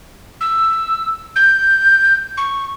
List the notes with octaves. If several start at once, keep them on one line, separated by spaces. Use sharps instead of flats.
E6
G6
C#6